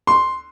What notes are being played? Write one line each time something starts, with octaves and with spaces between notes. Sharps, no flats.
C6